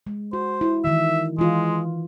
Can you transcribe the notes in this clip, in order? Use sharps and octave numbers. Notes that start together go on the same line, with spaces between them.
G#3
F#4 C5
E4
D#3 E3 E5
E3 G#3 F4